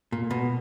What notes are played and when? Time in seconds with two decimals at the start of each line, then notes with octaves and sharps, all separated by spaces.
0.12 A#2
0.31 B2